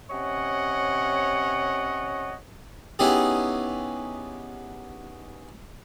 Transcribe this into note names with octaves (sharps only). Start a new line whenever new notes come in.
C3 C#4 C#5 D#5 F#5
B3 C#4 D#4 E4 G4 G#4